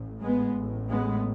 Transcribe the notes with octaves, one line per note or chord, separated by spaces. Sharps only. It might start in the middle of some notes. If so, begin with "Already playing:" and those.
Already playing: A1 A2
G#3 B3
A1 A2
G#3 B3